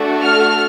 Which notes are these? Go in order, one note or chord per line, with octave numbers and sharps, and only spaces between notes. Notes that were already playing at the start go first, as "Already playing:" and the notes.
Already playing: A3 D4 F#4 A4
F6